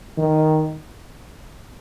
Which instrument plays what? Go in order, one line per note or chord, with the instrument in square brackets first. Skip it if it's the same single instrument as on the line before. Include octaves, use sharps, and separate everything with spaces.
[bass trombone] D#3